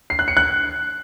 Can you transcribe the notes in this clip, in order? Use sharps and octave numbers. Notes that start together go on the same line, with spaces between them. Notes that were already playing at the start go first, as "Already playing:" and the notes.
C7
F#6
C#7
F#6